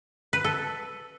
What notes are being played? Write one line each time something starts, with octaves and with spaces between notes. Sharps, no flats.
B4
A4